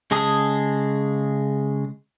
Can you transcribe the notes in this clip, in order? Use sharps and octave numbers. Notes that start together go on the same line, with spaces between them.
C#3 G#3 G#4 A5 D#6